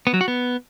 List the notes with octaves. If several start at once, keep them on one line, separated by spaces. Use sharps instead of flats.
B3
F#3
F#4
B3